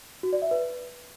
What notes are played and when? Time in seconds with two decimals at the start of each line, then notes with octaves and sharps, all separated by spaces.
0.23 F#4
0.33 D5
0.42 E5
0.51 B4